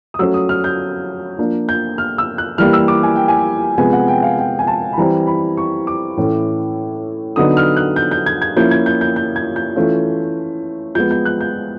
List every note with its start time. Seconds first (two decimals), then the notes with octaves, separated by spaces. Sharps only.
0.14 D#6
0.19 F#3 A3 C#4 E6
0.34 D#6
0.49 F6
0.64 G6
1.39 F3 A#3 D4
1.69 G6
1.98 F6
2.18 E6
2.38 F#6
2.58 E3 G3 A#3 F6
2.73 E6
2.88 D6
3.03 G#5
3.16 G5
3.28 G#5
3.78 C3 F3 G#3 B3 G#5
3.93 F#5
4.08 G5
4.23 F5
4.38 G5
4.59 G#5
4.67 A5
4.93 B5
4.97 E3 G3 C4 A#5
5.27 B5
5.57 C#6
5.87 D6
6.17 A2 E3 A3 C#4
7.36 D3 F#3 B3 D#4 D#6
7.57 F6
7.77 F#6
7.96 G6
8.11 G6
8.26 G#6
8.42 G#6
8.56 F3 A#3 C#4 E4 G6
8.71 G#6
8.86 G6
9.01 G6
9.16 G6
9.36 G#6
9.56 G6
9.76 E3 A3 C#4 F4
10.95 F3 G#3 B3 G6
11.11 G6
11.25 F#6
11.41 G6